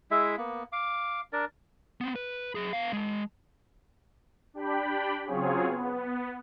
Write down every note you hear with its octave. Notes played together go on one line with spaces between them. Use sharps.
G#3 E4 E5
A#3 B3
F5 D6
D4 A#4 D5
B3 C4
B4
F#3 G#4
B3 F5
G#3 A5
D4 G4 G5 B5
C#3 F#3 C4 F4 G#4 C#5
B3